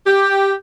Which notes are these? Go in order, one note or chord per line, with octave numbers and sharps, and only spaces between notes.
G4